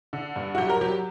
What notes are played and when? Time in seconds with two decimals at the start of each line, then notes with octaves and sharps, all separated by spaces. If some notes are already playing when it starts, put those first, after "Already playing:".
0.13 D3
0.36 G2
0.55 F#4
0.58 F#3 G4
0.70 A#4
0.81 F#3 G4